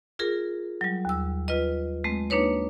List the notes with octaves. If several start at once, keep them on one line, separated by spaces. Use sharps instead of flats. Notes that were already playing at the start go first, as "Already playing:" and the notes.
F4 G#4 A#4
F#3 G3
D#2 E6
F4 B4 D#5
G#3 A3 C4
A#3 D4 D#4 B4 C#5